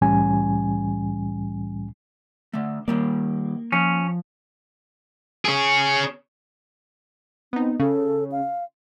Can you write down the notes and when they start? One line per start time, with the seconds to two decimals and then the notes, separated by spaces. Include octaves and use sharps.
0.01 C2 A2 E3 G3 C#4 G#5
2.53 D3 A3
2.88 D#3 G3 A#3 D5
3.72 F3 C#4
5.45 C#4 G#4
7.53 B3 C4 D#4
7.80 C#3 A4
8.32 F5